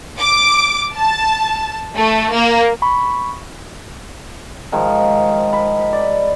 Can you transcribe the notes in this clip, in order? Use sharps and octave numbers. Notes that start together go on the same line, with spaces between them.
D6
A5
A3
A#3
B5 C#6
G#2 D#3 F3
B5
D5